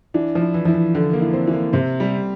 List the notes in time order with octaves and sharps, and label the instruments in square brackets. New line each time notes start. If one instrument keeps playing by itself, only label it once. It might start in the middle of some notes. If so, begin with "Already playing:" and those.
[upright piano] E3 [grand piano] D4
[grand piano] F3
[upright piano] E4
[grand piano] E3
[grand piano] F3 [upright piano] E4
[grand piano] E3
[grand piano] D3 [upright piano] E3
[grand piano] A#3
[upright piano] E4
[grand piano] C4
[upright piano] E3
[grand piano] A#3
[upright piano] C3 [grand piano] C4
[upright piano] G3